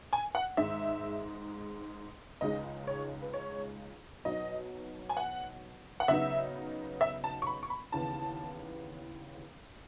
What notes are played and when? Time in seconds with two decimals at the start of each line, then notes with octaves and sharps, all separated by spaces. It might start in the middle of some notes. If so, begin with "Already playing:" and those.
0.13 G#5
0.35 F#5
0.57 G#2 D#3 G#3 D#4 E5
2.41 C#2 C#3 G#3 D#4 D#5
2.87 C#5
3.22 B4
3.33 C#5
4.25 B2 F#3 B3 D#4 D#5
5.09 G#5
5.17 F#5
6.00 F#5
6.08 C#3 F#3 B3 D#4 E5
7.01 E5
7.24 A5
7.42 C#6
7.47 B5
7.63 C#6
7.70 B5
7.92 D#2 C#3 E3 B3 A5